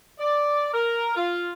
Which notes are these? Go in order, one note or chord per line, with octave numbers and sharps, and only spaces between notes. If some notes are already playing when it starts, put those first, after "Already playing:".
D5
A#4
F4